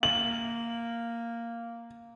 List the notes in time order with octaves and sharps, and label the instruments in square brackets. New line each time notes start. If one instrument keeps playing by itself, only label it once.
[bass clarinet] A#3 [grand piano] F#7